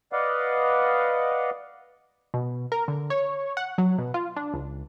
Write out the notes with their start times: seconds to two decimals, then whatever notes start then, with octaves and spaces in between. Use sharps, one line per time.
0.13 B4 D5 D#5 F5 F#5
2.34 B2
2.72 A#4
2.88 D3
3.10 C#5
3.57 F#5
3.78 F#3
3.98 B2
4.14 F4
4.36 D4
4.54 C#2